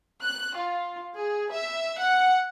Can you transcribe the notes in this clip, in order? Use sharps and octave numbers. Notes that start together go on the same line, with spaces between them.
F#6
F4
G#4
E5
F#5